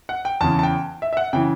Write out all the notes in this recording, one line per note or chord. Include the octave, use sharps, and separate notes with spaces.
F#5
G5
E2 C#3 E3 A5
A5
G5
E5
E5
F#5
C#3 E3 G5